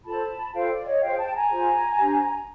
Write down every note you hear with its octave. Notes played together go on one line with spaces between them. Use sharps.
F4 A4 C5 A5 B5
F4 A4 C5 F5 G5
D5
C#5 D#5
F4 G#4 C5 F5 G5
G5 A5
G#5 A#5
F4 G#4 C5
D4 G4 C5